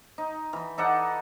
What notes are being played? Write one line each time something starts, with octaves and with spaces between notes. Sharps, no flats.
D#4
E3 B5
D#4 A4 D5 F#5